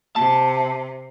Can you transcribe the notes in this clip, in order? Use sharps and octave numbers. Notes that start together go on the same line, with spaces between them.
C3 A5